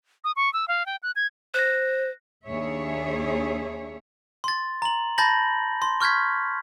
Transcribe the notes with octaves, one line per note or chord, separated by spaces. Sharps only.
D#6
C#6
E6
F5
G5
F#6
G#6
C5 F#6 A#6
D#2 D4 G#4 C#5 E5
C6 A6
A#5 F#7
A5 B5 G6 A6 A#6 F#7
C6
C#6 F6 G6 G#6 B6